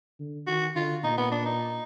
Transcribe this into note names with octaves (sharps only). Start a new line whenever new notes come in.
D3
D#3 F#4
D3 F4
A#2 D#4
B3
D4
D#4